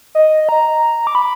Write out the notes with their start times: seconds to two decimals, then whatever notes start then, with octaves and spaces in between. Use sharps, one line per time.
0.15 D#5
0.49 A#5
1.07 D6
1.15 B5